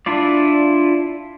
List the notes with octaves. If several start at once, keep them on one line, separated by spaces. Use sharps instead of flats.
D4 E4 F4 D5